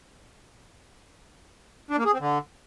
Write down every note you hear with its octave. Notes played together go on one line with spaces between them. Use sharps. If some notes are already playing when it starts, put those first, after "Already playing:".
D4
A#3
G#4
C4
D3